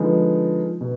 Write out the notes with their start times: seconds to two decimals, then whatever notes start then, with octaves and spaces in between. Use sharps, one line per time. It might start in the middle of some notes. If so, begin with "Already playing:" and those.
Already playing: D3 F3 G#3 B3 D#4
0.81 B2